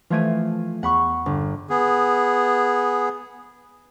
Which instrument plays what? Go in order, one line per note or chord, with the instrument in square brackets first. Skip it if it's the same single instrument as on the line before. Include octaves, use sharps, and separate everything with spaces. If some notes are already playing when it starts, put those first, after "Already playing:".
[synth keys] E3 F3 A3 [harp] F4 G#6 D#7
[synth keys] E2 [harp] F#5 B5 C#6
[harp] G1
[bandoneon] B3 G#4